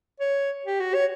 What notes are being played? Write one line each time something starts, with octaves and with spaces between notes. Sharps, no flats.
C#5
G4
F#4
C#5